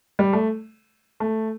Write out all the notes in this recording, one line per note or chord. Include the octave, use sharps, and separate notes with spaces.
G3
A3
A3